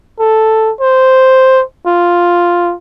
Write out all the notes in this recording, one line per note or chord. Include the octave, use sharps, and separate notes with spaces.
A4
C5
F4